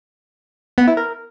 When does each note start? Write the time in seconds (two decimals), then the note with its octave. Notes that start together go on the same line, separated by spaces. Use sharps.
0.78 B3
0.87 E4
0.97 A#4